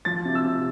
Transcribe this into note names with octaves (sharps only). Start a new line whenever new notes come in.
F3 A6
C3
E6
C3